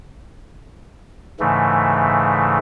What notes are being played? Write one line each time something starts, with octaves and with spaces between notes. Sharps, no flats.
G#2 C#3 E3 A3